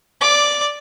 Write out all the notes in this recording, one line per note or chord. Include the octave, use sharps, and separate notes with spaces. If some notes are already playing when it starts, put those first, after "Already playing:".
D5 D6